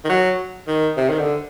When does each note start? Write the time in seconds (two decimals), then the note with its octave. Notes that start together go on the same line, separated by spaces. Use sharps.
0.05 D#3
0.09 F#3
0.68 D#3
0.97 C3
1.09 D#3
1.18 D3